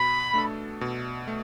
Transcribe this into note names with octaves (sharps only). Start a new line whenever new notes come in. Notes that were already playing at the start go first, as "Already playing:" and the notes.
Already playing: B2 B5
A3 D4 A4
B2
A3